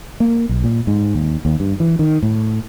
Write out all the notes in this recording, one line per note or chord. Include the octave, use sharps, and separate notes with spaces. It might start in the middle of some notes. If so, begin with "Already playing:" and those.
A#3
B1
A#2
G#2
D#2
D#2
G2
E3
D#3
A2